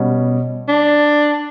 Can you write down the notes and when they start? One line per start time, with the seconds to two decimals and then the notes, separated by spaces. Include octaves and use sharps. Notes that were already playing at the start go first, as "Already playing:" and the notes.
Already playing: B2 G3 C#4
0.68 D4